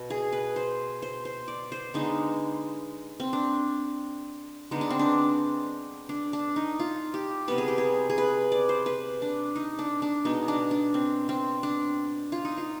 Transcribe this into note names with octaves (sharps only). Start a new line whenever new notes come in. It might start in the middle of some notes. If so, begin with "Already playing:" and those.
Already playing: B2
G#4
B4
C5
C5
C5
D5
C5
D3 G#3 B3 D#4
C4
D4
D3 G#3 B3 D#4
D4
C4
D4
D4
D4
D#4
F4
G4
C3 G3 B3 B4
G#4
G4
G#4
G#4
B4
D5
C5
B4
D4
D#4
D4
D4
B2 G#3 B3 D#4
D4
D4
C4
C4
D4
F4
D#4
F4